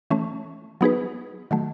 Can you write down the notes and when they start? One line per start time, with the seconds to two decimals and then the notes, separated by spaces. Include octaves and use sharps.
0.10 E3 A3 C#4
0.81 F#3 B3 D#4 G#4 B4
1.51 D#3 F#3 A3